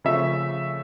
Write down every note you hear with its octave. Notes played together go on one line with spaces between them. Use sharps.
C#3 F3 A3 C#4 E5